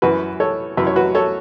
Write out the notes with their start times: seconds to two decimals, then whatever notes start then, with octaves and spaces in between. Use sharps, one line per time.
0.02 F#2 E3 F#4 B4
0.40 A4 C#5
0.77 F#2 E3 B4 E5
0.87 C#5
0.96 F#4 B4
1.15 A4 C#5